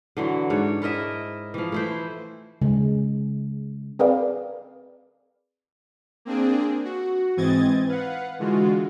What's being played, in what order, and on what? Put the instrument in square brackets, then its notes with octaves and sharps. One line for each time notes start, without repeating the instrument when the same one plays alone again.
[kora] D3 E3 F#3
G#2 D4 C#5
E4 A#4 D#5 E5
E3 F3
A3 E4 C5
[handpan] C#3 G#3
[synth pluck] C4 G#4 A#4 B4 D5 F5
[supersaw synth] A#3 C4 D4 G#4
F#4
G#2 E3 C4 D#5 G#6 A6
B4 F5 F#5
D3 E3 G#3 F4 F#4